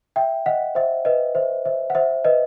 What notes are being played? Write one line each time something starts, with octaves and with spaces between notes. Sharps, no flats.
E5 G5
D#5 F#5
C5 E5
B4 D#5
C5 E5
C5 E5
F#5
C5 E5
B4 D#5